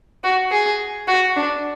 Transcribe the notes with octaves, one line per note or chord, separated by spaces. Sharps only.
F#4
G#4
F#4
D4